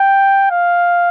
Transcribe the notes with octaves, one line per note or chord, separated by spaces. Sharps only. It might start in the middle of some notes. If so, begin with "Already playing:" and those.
Already playing: G5
F5